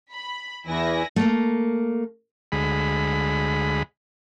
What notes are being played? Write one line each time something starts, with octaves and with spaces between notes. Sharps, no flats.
B5
E2 E3 E4 G#5 A#6
A3 A#3
D2 G#3 B5